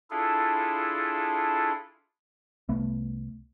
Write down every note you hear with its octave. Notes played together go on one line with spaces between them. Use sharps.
D4 E4 F4 G#4 A4
C2 A3 B3